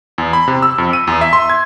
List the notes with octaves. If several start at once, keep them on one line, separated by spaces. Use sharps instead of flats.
E2
B5
C3
E6
F2
D#7
E2
E5
C6
G#6